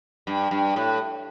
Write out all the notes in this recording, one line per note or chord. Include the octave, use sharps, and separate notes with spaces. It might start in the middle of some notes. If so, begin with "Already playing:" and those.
G2
G2
A2